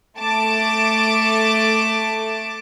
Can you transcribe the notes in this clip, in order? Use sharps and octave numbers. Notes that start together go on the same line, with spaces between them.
A3 A5 D6